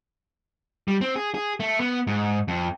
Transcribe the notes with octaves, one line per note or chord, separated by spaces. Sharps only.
G3
C4
G#4
G#4
A3
B3
G#2
F2